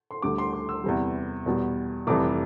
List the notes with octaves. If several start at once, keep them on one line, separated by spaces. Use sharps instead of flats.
C6
D2 D3 G3 D6
C6
D6
E6
E2 C3 E3 G3
E2 B2 G3
F1 F2 E3 G3 D6